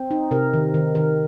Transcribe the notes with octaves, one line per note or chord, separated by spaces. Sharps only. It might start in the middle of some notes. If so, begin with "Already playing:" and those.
Already playing: C4 C5
D#4
C3 A#4
D#3
D#3
D#3 A#4